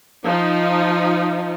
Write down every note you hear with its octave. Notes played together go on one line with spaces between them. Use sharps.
F3 D#4